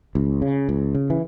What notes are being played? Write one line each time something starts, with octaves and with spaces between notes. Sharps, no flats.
C#2
C#3
C#2
C#3
E3